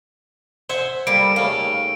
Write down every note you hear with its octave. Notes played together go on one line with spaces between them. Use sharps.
C5 E5 F#5 G#5
G3 A#3 A4 D7
D#2 C#3 A3 F5